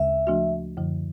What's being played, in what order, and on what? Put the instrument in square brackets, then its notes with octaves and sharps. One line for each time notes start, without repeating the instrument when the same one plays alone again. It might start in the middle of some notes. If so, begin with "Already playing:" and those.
Already playing: [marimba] D2 C#3 G#3 C#4 [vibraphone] E5
[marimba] F3 A3 D4 F#4
F#2 D3 F3